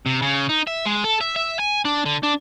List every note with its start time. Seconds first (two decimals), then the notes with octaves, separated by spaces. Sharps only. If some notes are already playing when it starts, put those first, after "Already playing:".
0.06 C3
0.22 C#3
0.49 D#4
0.67 E5
0.85 G#3
1.04 A4
1.21 E5
1.36 E5
1.60 G#5
1.85 D4
2.06 D3
2.23 D4